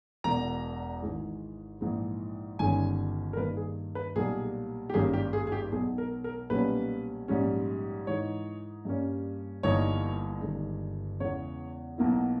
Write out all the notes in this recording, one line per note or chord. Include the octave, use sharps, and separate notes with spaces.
E1 E2 B2 A#5
G#1 G#2 E3 G#3
A#1 G#2 E3 G#3
G1 G2 D#3 G#3 C#4 G#5
A#4
G2 D#3 A#3 B4
G#4
B4
B1 A#2 G3 A#3 G#4
G4
G#1 G2 G3 A#3 C#4 G#4
G4
G#4
G#4
G4
B1 B2 G#3 G#4
A#4
A#4
B1 A#2 G3 A#3 C#4 B4
A#1 G#2 G3 C#4
G#2 E3 G#3 D#4 C#5
G2 G3 A#3 C#4
G1 G2 E3 A#3 D#4 C#5
G1 G2 D#3 G#3
E2 C#3 G#3 B3 E4 C#5
B1 B2 A#3 E4